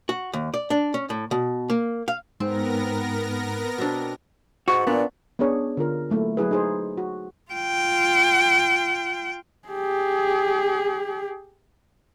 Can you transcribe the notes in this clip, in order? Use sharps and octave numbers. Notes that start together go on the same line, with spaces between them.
F#4
D#2
D5
D4
C#4
A2
B2
A#3
F5
G#2 B3 C4 A#4 A#6
B2 C4 D4
G#2 F#4 C#6
A#2 B3 D4
B3 C#4 D4 G#4 C#5
D3 F4 A#4
F#3 A3 A#3 E4
F#3 E4 G#4 B4
D#4 G#4 C5
F#4
F4 G5
G4 G#4